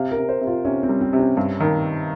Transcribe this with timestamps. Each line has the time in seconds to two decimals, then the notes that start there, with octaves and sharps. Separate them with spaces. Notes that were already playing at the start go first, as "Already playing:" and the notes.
Already playing: C3 F5
0.11 A#4
0.17 C3
0.29 C5
0.41 C3
0.47 F4
0.65 C3 C#4
0.83 C4
0.89 G3
1.01 C4
1.13 C3
1.19 C#4
1.37 G2
1.60 D#3